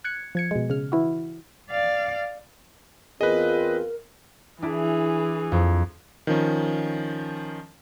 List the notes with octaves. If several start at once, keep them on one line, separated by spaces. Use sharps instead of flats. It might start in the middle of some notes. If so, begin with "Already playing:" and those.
F#6 G#6 C#7
F3 G#6 C#7
B2 G#3
C#3 F6
E3 E4 F#4
D5 F5
E2 C4 F4 G#4 A#4 B4 D#5
E3 D4 E4 G#4
F2
D#3 F3 C#4